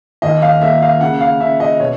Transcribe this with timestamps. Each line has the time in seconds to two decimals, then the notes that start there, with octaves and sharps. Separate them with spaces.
0.22 D#2 D#5
0.42 F5
0.61 A#3 E5
0.82 F5
1.01 C#3 F#5
1.21 F5
1.40 C#3 E5
1.60 D#5
1.79 B2 C#5